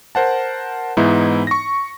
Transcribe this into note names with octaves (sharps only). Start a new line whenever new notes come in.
A#4 C5 F#5 A5
G#2 E3 B3 D#4 E4
C#6 A#6